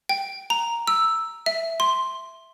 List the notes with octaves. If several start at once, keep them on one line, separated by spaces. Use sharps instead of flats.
G5
A#5
E6
E5
C6